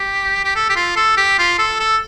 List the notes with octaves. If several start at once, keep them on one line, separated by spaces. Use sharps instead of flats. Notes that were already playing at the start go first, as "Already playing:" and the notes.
Already playing: G4
G4
A4
G4
F4
A4
G4
F4
A4
A4